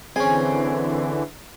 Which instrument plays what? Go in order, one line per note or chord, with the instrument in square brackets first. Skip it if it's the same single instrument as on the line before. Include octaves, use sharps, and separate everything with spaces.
[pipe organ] D3 E3 [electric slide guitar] C4 [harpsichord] C#4 G#4 [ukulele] G#5